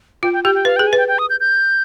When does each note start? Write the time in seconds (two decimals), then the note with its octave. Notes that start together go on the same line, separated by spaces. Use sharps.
0.23 F4 G5
0.33 G5
0.44 G4 G5
0.55 G5
0.65 B4 F5
0.76 G5
0.79 G#4
0.87 G#5
0.93 B4 G5
1.08 G5
1.19 D#6
1.30 G6
1.40 G6